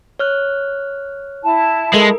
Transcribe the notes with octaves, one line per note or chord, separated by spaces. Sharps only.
C#5 F6 F#6
E4 A5
G#3 A4 A#4